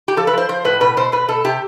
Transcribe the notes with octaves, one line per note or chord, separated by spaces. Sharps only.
G4
F3 A4
B4
F3 C5
F3 C5
A2 B4
B2 B4
B2 C5
B2 B4
B2 A4
C3 G4